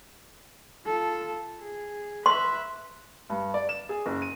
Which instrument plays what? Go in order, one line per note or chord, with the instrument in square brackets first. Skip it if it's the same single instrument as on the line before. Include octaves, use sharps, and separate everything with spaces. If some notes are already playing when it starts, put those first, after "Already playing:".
[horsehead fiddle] F4 A4
G#4
[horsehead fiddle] B4 E5 [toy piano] C6
[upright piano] G2
D5
E7
G#4
F#1
D#7